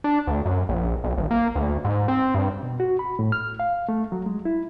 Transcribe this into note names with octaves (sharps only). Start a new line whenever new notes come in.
D4
D2
F#2
A#1
B1
G#1
A#3
D2
G#2
C4
G2
B2
F#4
B5
A2
F6
F5
A3
F#3
G#3
E4